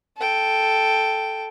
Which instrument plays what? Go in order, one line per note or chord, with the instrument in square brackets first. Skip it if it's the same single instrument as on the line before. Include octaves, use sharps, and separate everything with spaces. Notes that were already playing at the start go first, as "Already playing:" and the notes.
[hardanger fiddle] A4 G5